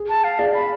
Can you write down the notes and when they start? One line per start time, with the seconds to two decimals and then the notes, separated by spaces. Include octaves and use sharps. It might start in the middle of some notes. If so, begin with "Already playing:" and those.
Already playing: G#4
0.09 A5
0.24 F5
0.39 G#4 D5
0.54 B5